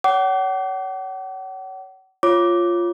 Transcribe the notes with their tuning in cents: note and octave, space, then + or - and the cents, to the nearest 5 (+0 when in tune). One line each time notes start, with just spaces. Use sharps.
C#5 +25 F#5 +40 D6 -25
F4 -5 C#5 -10 D6 -5